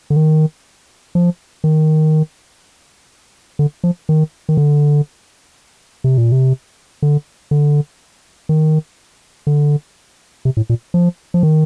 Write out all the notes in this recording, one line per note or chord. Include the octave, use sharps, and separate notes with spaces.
D3
D#3
F3
D#3
D3
F3
D#3
D#3
D3
C3
A#2
C3
D3
D3
D#3
D3
C3
A2
A#2
F3
F3
D#3